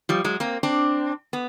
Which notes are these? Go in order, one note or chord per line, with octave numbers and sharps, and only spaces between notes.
F3 G3
F#3 G#3
A#3 C4
C4 D4
B3